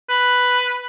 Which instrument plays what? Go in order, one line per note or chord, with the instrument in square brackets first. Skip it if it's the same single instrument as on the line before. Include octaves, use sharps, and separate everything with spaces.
[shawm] B4